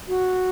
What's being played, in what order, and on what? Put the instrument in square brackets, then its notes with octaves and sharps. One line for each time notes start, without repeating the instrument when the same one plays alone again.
[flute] F#4